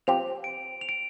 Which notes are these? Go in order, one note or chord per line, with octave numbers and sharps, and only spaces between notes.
F3 C4 G4 F7
D7
F7
D7